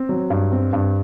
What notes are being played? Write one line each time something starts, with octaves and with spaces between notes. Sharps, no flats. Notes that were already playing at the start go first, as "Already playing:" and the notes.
Already playing: C4
F#3
G2
C4
G2